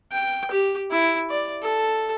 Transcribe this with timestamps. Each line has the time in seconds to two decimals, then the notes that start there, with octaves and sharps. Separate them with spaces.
0.12 G5
0.51 G4
0.91 E4
1.30 D5
1.63 A4